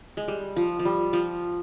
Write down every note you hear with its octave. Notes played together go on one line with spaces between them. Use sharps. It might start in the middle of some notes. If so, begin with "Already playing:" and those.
G#3
G3
F3
F3
G3
F3